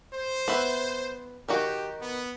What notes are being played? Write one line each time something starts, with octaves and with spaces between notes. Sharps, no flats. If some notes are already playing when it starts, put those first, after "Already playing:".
C5
B3 B4 E5
D#3 D#4 F#4 G4
B3